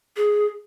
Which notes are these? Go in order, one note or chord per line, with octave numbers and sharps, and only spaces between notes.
G#4